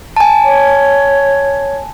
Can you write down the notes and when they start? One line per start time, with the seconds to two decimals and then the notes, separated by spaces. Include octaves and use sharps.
0.17 G#5 A5
0.45 C#5